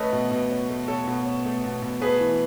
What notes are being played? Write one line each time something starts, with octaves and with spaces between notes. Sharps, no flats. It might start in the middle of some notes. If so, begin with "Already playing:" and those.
Already playing: A3 C#4 B4 D#5
B2
B2
C#4
A3
B2 A4 C#5
B2
C#4
A3
B2
B2
A3 G#4 B4
E3